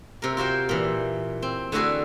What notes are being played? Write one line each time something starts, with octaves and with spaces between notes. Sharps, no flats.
C3 A#4
F4 F#4 C5 G5
A#2 E3
C4
D3 A3 E4 F#4 G#4